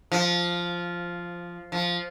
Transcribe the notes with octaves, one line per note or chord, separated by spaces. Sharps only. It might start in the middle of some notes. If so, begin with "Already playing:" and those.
F3
F3